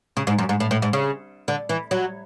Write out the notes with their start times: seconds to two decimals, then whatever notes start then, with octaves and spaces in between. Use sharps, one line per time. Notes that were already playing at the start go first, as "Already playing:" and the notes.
0.17 C#3
0.27 G#2
0.38 F#2
0.49 G#2
0.60 A2
0.71 A2
0.82 G#2
0.93 C#3
1.48 D3
1.69 E3
1.91 F#3